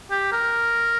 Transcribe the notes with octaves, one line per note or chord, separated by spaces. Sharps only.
G4
A#4